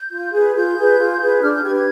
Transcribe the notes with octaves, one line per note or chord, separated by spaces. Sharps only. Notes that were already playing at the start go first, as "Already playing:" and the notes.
Already playing: G6
F4
G#4 B4
F4 G6
G#4 B4
F4
G#4 B4
D4 F6
G6
G4 B4 G#6
G#6